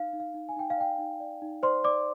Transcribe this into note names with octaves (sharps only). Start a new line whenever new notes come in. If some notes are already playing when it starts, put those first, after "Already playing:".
Already playing: D#4 F5
D#4
F5
D#4
G#5
D#4 G5
F5
D5 G5
D#4
D5
D#4
C5 D5 C6
D5 D6